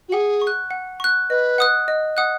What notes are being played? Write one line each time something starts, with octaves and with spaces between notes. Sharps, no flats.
F#4
G#4 F#5
C#6
F#6
F#5
C#6 F#6
B4 D#5
F#5 D#6 F#6
D#5
F#5 D#6 F#6